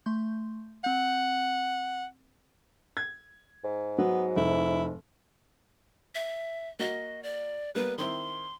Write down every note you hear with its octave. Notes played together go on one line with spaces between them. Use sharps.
A3 C6 G6
C4 F#5 G6
G#6
G#2
F#3 B3
F1 E4
E5
A#3 F#4 D#5
D5
G3 A#3 B3 B4
D#3 C4 E4 C6